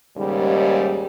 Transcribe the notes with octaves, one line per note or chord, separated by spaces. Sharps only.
D#2 G#2 C#3 G3